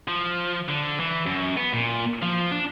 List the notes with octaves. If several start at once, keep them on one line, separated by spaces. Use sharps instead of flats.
F3
D3
E3
F#2
B3
A#2
F3
D4